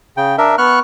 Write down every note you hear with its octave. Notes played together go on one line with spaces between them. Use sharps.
C#3 G5
D4 A#4 E5
B3 C#6 F6 F#6